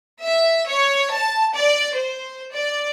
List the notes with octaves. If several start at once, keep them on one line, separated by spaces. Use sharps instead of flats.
E5
C#5
A5
D5
C5
D5